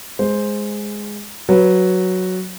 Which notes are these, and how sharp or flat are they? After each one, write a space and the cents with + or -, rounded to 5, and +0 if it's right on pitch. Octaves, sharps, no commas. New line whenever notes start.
G#3 +0 C5 +0
F#3 +0 B4 +0